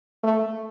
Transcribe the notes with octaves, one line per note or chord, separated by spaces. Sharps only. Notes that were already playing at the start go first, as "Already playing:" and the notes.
A3